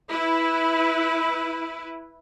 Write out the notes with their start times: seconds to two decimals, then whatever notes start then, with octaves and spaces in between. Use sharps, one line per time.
0.11 E4 B4